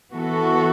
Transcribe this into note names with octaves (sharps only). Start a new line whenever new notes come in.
E3 B3 F#4 A4